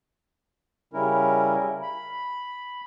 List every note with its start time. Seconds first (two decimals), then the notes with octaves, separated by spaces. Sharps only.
0.94 C#3 G3 C#4 E4 A#4
1.82 B5